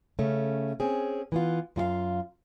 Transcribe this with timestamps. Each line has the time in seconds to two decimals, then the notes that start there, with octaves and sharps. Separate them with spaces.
0.19 C#3 A3 C#4
0.80 C4 C#4 G#4
1.32 E3 B3 F4
1.76 F#2 F4 F#4 F5